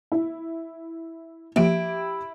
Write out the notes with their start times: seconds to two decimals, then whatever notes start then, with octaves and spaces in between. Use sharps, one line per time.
0.12 E4
1.56 F3 A#3 E4 G4 D7